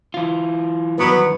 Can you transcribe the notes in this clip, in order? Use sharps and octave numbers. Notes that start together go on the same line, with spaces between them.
E3 F4
E2 G2 D#3 F#3 B3 B4